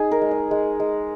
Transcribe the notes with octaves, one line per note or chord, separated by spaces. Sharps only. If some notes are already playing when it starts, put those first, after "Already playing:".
Already playing: D#4 G#4
A#4
G#3
D#5
G#3
G#3